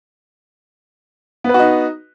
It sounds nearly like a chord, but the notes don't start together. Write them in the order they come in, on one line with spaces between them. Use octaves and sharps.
B3 B4 F#4 D#4